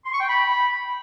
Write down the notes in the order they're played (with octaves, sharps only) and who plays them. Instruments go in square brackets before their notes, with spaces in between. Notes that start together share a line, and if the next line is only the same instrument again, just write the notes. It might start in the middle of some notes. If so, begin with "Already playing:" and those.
[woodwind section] C6
C#6
G5
B5